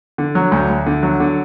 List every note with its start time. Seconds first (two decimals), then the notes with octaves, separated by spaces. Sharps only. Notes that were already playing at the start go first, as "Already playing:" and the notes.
0.18 D3
0.35 F#3
0.52 D2
0.69 D2
0.86 D3
1.03 F#3
1.20 D3